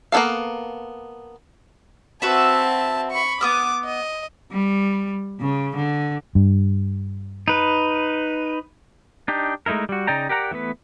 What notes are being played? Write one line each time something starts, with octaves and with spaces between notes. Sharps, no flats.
A#3 B3 D4 A4 F5
C4 F#4 B4 E5 A5
B5 C#6
B3 D6 D#6 F6
D#5
G3
C#3
D3
G2
D#4 B4
D4 D#4 G4
G#3 A3 D#4 E4 A#4
G3 F#4
C#3 D#4 D5 G5 A#5
G4 A#4 D5 F#5 A#5
E3 A3 B3 B4